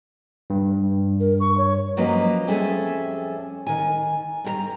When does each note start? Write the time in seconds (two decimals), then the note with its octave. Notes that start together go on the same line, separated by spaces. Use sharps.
0.50 G2
1.20 A#4
1.40 C#6
1.57 C#5
1.97 F3 F#3 A#3 C#4 B4 D#5
2.47 F2 G3 C#4 G#4 A4 E5
3.67 D#3 G#5
4.44 G2 A#4 A#5